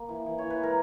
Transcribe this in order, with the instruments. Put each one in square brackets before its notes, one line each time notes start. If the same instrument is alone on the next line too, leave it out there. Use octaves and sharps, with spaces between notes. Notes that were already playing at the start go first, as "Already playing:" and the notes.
Already playing: [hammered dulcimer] A#3
E3
E3
E3 C#5
B4
G#3 A#4